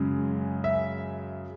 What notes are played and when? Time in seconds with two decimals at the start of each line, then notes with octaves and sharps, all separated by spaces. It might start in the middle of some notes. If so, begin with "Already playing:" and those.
Already playing: F#2 C#3 G#3
0.64 E5